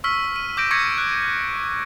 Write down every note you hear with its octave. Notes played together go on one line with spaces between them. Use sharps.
C#6 E6 F6 B6
D#7
D6 G6 A#6 D7
C#6 D6 G#6 A#6 B6 C#7
F#6